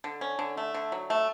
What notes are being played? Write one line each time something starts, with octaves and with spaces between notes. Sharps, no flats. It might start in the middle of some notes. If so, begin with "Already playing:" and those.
D3
C#4
D3
A3
D3
F#3
A3